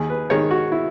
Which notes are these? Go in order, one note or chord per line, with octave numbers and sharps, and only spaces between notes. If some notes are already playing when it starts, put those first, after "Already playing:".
Already playing: D#2 G#4
B4
D#3 G#3 C#5
F#4
E4